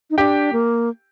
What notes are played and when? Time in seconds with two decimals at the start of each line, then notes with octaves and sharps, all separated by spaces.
0.10 D#4
0.18 D4 G4 G5
0.53 A#3